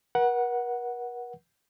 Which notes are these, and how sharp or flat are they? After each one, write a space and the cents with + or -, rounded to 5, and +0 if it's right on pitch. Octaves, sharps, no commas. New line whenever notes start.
A#4 +45 F#5 +0